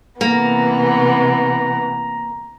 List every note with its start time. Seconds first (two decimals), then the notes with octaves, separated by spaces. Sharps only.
0.21 C3 E3 A#3 B3 A#5